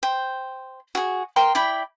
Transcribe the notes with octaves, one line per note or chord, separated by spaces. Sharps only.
C5 G5
F#4 G#4
A#4 G5 C6
E4 D5 G5 B5